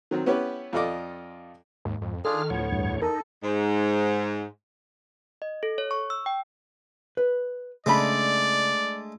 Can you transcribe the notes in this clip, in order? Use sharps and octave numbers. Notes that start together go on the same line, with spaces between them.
D#3 F#3 C4
B3 C#4 E4 G4 B4 C#5
F2 F4 A4 D5 D#5 D6
D#2 G#2
F2
D#3 D4 F4 G#4 A4 F6
D2 A2 F3 B3 C#5
E2 G2
D#4 A4 A#4
G#2
D#5
A4
C#5
C#6
E6
G5
B4
C#3 G#3 A3 D4 D5 B5